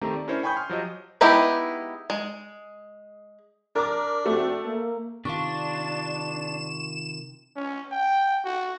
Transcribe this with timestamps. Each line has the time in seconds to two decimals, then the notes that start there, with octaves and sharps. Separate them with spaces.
0.01 D#3 A3 C4 G4 A#5
0.16 D5
0.28 C#4 D4 E4 A#4 C5 C#5
0.43 G5 G#5 B5 C#6 D#6 G6
0.55 G#5 C6 F6
0.69 F3 F#3 G4 D#5
1.21 G#3 B3 D#4 E4 G4
2.10 G#3
3.76 D4 A#4 D6
4.26 A3 C4 F#4
4.65 A#3
5.25 C3 D#3 D4 F4 C#6 E7
7.56 C#4
7.92 G5
8.45 F#4